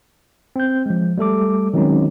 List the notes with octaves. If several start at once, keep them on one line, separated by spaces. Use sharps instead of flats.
C4 G6
F3 G#3
G3 A3 A4 D6
D#3 F#3 G#3 C4 C#4 D#4